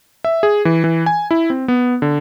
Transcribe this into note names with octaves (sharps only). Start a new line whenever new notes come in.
E5
G#4
E3
E3
G#5
E4
C4
B3
D3